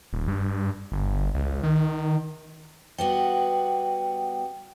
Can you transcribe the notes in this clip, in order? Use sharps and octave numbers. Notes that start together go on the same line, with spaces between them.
D#1
G2
G1
C#2
D#3
G3 B3 F#4 G5